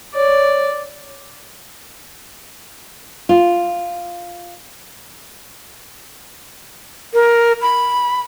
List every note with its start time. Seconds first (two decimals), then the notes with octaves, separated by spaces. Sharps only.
0.15 C#5 D5
3.29 F4
7.14 A#4
7.62 B5